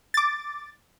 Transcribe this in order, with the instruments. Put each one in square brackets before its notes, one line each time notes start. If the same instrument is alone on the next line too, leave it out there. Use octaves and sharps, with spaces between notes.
[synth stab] D6 A6